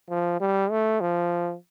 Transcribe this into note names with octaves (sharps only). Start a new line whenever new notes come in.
F3
G3
A3
F3